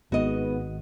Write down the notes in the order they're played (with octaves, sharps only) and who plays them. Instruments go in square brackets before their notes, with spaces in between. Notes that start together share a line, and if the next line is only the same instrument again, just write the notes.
[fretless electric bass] G#1 [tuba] G#2 [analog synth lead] B3 [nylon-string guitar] F#4 D#5